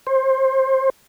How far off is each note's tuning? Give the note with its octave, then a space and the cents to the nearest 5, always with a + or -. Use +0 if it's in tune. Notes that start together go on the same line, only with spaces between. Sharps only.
C5 +25